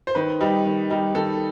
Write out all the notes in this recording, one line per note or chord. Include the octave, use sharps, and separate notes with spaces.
C5
D#3 B4
G3 D#4
D#3
G3 D#4
D#3 A4